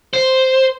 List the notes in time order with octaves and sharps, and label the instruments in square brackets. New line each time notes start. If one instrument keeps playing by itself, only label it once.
[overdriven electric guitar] C5